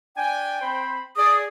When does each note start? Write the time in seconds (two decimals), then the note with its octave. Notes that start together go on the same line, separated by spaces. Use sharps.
0.16 D4 G5 G#5
0.60 C4 C5 B5
1.17 G#4 D5 D#6